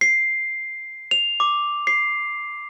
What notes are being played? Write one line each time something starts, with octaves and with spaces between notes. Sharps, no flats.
C7
F7
D6
C7